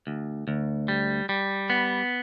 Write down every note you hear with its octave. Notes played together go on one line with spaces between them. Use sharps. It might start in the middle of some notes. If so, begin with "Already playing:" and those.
D2
D2
G3
G3
B3